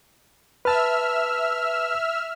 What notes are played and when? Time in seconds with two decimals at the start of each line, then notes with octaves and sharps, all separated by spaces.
0.65 B4 E5 A5 E6 F6